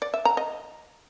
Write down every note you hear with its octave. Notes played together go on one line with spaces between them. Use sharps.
D5
E5
A#5
D#5